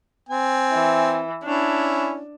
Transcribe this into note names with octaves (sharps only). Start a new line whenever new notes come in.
C4 G#5
E3
C#4 D4 E4